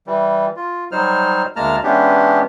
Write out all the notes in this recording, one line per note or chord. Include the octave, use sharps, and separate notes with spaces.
E3 G3
F4
F#3 G3 D#4 C5 F6
D2 G#3 A#3 A5 A#5 F6
E3 G#3 B3 C#4 D4 G4